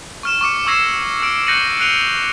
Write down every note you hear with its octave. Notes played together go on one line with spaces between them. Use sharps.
C#6 F6 E7
C#6 D6 C#7
C#6 E6 G#6 A#6 C7 E7
E6 F6 D7
F#6 G6 A#6 C#7 D#7 F#7
F#6 C7 D7 D#7 F7 G7